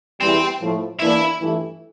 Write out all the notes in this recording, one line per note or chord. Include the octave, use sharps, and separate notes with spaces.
E2 E3 G3 C4
A2 F3 A3
E2 E3 A#3 D4 E4
G2 E3 A3 E4